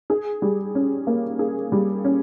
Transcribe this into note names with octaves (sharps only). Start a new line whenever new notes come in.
G#4
G3
C#4
A#3
G#4
G3
C#4